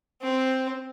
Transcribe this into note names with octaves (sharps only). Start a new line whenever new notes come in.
C4